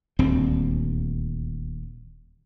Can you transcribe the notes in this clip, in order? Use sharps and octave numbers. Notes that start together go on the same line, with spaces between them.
D#1 D2 C4